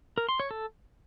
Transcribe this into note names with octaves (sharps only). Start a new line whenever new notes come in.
A#4
C6
C#5
A4